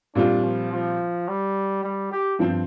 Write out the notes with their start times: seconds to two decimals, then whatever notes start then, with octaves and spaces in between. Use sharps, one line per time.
0.15 A#2 G3 C4 D4 F4
0.44 F3
0.71 F3
1.28 G3
1.83 G3
2.12 G4
2.39 G2 F3 C4